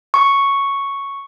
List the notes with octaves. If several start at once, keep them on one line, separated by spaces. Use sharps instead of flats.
C#6